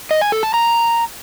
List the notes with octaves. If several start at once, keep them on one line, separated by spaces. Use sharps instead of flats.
D#5
G#5
A4
A5
A#5